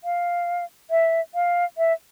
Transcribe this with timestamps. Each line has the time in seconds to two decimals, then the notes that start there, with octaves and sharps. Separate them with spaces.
0.04 F5
0.91 E5
1.35 F5
1.78 E5